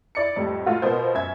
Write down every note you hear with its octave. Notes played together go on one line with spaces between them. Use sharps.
E4 D5 C#7
F2 A2 G3
A2 F4 F#4
B2 B3 F4 A#4 C5
F#2 E5 G#6